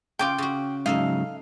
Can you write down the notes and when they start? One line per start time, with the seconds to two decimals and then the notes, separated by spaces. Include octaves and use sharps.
0.19 C#3 F4 G5 D6
0.38 C#3 F#4
0.86 G#2 C#3 F#3 D#4 A4 E5 F5